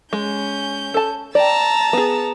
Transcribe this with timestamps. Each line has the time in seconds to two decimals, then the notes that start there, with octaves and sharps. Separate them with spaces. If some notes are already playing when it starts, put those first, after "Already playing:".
0.13 G#3 C#4 G6
0.94 A4 A5
1.35 D5 G5 A5 A#5 E6
1.93 B3 G#4